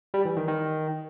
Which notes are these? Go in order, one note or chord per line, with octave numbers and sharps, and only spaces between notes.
G3
E3
D#3
D#3